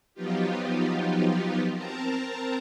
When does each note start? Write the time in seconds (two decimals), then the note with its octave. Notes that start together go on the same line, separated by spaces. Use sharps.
0.14 F3 F#3 B3 D#4 F4 G4
1.74 C4 A#4 A5 A#5